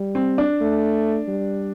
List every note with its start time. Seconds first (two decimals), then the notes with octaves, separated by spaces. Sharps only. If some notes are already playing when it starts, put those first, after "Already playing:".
Already playing: G3
0.15 C4
0.38 D4
0.60 A3
1.28 G3